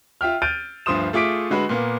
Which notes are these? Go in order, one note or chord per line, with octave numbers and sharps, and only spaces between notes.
F4 E5 G5 F6
F6 G6 A6 D7 D#7
D2 G2 F3 C6 D#6 E7
A3 F4 G#4 D6 B6 D7
D3 G#3 F#4 B4
A#2 A#3 B3